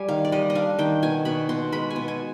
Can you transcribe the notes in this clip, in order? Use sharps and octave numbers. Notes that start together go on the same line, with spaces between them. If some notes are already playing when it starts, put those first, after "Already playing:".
Already playing: G3 G#5
D#3 F5
D5
G3 D#5
D#5
D4 F5
D#3 G5
B2 G#5
B2 B5
B2 C6
G#3 B5
G#5
B2
G#5